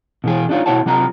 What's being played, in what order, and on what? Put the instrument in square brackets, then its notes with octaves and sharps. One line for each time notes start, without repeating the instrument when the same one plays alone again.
[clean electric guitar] B2 E3 G#4
D4 D#4 F4 C#5
B2 E4 F#4 C#5 F#5 A5
C3 F#3 F4 A#5